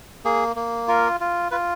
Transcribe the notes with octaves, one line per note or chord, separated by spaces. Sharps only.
A#3 G#4
A#3
F4 A#4
F4
F4 B4